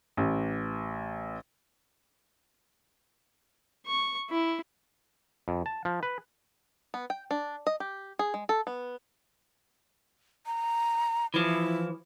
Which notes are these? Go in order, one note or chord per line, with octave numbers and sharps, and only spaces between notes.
A1
C#6
E4
F2
A5
F3
B4
B3
G5
D4
D#5
G4
G#4
G#3
A4
B3
A#5
E3 F3 E4